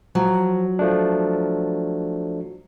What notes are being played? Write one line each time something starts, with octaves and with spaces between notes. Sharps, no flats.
F3 F#3
F3 A3 D4